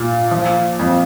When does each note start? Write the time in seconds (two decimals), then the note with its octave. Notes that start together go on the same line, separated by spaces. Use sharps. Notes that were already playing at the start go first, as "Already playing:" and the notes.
Already playing: A#2
0.31 F3
0.79 F2